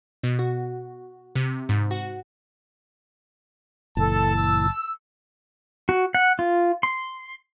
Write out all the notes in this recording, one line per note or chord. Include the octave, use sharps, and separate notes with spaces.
B2
F#4
C3
G#2
F#4
F#1 A#2 E3 A4 A5
E6
F#4
F#5
F4
C6